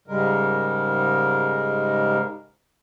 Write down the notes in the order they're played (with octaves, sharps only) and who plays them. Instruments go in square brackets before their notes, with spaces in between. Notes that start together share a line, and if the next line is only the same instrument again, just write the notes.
[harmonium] G#2 C#3 G3 G#3 A#4